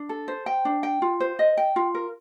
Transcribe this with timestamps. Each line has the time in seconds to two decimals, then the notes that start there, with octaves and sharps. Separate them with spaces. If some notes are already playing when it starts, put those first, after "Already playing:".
Already playing: D4
0.09 A4
0.28 C5
0.46 G5
0.65 D4
0.83 G5
1.02 F4
1.20 C5
1.39 D#5
1.57 G5
1.76 F4
1.95 A#4